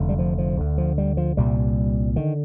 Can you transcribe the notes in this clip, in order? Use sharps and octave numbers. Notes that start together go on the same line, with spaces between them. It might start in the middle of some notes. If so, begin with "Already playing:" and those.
Already playing: F1 F2 D3
G3
F3
F3
D2 D3
F3
G3
F3
C2 A#2 G3
D3 D#3